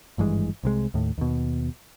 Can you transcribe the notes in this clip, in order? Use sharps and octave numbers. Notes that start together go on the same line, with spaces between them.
G#1 G2 E3 G#3
C2 C3 G#3
D#2 A2
D#2 B2